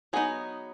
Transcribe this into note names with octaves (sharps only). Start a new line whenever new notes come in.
F#3 B3 D#4 G#4